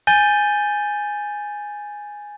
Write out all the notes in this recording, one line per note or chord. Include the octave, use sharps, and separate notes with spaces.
G#5 G6 A6 D#7 G7